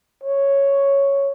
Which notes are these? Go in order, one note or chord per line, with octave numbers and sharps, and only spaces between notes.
C#5